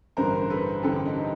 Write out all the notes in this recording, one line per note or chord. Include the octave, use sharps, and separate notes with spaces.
A1 G2 D3 A#4 C5
A4 B4
A1 G2 D3 G4 A4
D#4